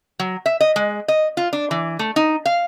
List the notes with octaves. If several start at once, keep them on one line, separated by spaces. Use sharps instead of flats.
F#3
E5
D#5
G#3
D#5
F4
D4
E3
A3
D#4
F5